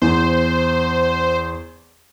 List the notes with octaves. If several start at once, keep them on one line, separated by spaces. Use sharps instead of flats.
E2 C5